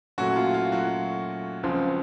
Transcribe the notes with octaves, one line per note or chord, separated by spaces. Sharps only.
A#2 F#3 A3 C#4 F#4
F4
F4
F#3 F#4
C#2 C#3 F3 C4